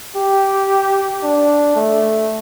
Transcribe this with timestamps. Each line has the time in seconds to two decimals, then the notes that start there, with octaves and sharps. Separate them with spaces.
0.16 G4
1.23 D4
1.76 A3